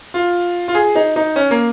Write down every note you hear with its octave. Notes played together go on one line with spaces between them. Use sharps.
F4
F4
G#4
D#4
D#4
C#4
A#3